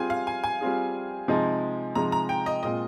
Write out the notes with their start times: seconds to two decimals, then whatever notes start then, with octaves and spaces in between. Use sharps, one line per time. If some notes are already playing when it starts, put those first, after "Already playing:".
Already playing: G3 C4 F4 G#4 G#5
0.10 F5
0.27 G#5
0.44 G#5
0.61 G3 C4 F4 G#4
1.28 C3 F3 G#3 D#4
1.95 C3 F3 G#3 D#4 A#5
2.12 A#5
2.29 G5
2.46 D#5
2.63 A#2 G#3 C4 F4 D#5